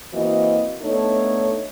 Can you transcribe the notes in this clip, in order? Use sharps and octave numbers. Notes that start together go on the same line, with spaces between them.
E3 A#3 C4 F#4 D#5
A3 B3 D4 D#4 A4 C#5